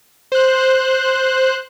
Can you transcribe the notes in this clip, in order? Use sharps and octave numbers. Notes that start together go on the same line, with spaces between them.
C5 F#6